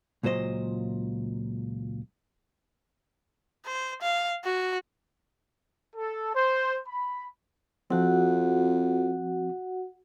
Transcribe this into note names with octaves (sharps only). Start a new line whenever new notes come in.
C#2 A#2 F#3 C5 D#5
C5
F5
F#4
A4
C5
B5
F2 F3 C4 F#4 F#5